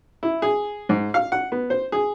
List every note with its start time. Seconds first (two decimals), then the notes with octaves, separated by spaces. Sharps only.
0.23 E4
0.42 G#4
0.89 G#2
1.14 F5
1.32 F#5
1.52 B3
1.70 C5
1.92 G#4